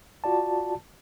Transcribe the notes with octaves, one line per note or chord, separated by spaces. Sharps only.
F4 F#4 D5 A5